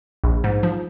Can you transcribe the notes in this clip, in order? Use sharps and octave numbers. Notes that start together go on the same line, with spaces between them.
A#1
G#2
F3